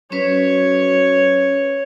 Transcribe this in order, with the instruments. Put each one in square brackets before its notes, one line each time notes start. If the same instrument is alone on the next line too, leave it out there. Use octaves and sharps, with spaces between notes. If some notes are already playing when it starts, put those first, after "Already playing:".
[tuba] F#3 [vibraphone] C#4 B4 [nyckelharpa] C#5